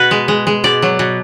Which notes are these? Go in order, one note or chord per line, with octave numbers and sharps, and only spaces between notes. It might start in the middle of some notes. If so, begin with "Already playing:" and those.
Already playing: B2 F#4 B4
G#3
G#3
G#3
B2 D5
F#3
B2